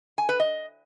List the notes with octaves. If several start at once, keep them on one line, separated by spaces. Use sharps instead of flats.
G#5
B4
D#5